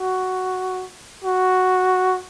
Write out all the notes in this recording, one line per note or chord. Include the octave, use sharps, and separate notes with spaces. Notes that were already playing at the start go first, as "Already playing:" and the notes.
Already playing: F#4
F#4